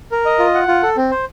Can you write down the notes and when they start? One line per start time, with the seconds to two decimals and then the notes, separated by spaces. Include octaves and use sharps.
0.11 A#4
0.25 D#5
0.39 F4
0.55 F#5
0.68 F4
0.83 A4
0.97 C4
1.11 C5